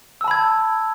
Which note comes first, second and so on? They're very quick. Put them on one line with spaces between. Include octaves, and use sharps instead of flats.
E6 A5 B5 G#6